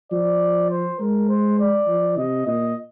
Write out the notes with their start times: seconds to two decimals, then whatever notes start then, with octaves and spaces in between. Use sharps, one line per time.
0.12 F3 D5
0.70 C5
1.00 G#3 A#4
1.29 C5
1.59 D5
1.88 F3
2.17 C3 D#5
2.47 A#2 D#5